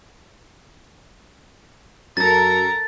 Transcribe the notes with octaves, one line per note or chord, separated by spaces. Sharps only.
F#2 A4 A#4 A#5 A6